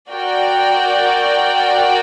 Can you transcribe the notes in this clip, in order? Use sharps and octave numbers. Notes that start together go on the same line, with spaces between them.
F#4 A#4 D5 G5